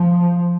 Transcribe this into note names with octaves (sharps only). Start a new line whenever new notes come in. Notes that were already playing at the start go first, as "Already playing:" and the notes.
Already playing: F3